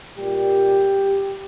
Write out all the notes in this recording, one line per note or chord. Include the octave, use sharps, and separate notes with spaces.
A#2 G3 A#3 G4